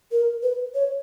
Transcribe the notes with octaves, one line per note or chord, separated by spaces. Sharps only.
A#4
B4
C#5